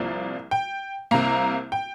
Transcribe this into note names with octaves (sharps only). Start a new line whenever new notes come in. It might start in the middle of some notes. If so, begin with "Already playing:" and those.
Already playing: C2 C3 F3 A#3 D5
G5
C2 C3 A#3 A#5
G5